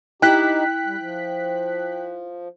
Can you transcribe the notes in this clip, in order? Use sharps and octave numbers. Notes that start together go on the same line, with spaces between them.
D#4 E4 G4 G5 F#6 B6
G3
F3